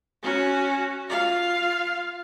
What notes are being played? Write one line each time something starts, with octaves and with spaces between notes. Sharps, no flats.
C#4 F#4
F4 F5